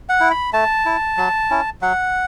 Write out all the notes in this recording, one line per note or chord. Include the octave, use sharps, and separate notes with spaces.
F#5
E4
B5
A3 A5
E4
F#3
C#4 E4
F#3 F#5